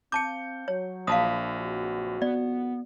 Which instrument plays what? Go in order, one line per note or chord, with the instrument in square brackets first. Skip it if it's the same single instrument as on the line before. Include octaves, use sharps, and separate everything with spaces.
[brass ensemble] C4 F5 [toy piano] A5 D6 [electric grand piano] G6 C#7
[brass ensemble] F#3 [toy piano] C#5
[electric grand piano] A#1 [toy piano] F5 A5 D#6
[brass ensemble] F#1 F2 F#4
[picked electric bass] B3 [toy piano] D5